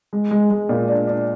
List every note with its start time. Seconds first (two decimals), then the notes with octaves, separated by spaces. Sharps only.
0.13 G#3
0.31 G#3
0.50 G#3
0.69 A#2
0.88 D4
1.07 D4